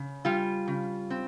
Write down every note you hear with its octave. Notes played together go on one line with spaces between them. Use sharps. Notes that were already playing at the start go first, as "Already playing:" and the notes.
Already playing: C#3
G3 F4
C#3
C4